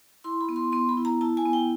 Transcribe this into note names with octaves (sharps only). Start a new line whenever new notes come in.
E4 C6
B5
B3
C6
B3 C6
B5
E4
A#5
E4 A5
G#5
B3
G5